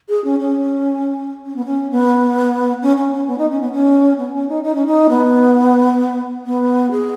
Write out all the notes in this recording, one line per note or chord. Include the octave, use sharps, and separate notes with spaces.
G#4
C#4
C#4
C#4
B3
C#4
B3
C#4
C#4
C#4
B3
D#4
C#4
B3
C#4
B3
C#4
D#4
D#4
C#4
D#4
B3
B3
G#4